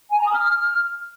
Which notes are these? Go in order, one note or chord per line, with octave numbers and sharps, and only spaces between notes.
G#5
A#5
D#6
F6